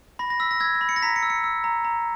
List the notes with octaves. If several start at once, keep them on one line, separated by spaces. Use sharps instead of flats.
B5 A#6
A#6
E6 B6
A#6
E6 G#6
A#6
B5
C#7
A#6
A#5 B6
C#7
E6
C#7
E6
A#5
A#5